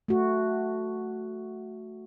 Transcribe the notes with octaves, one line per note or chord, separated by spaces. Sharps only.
A3 F#4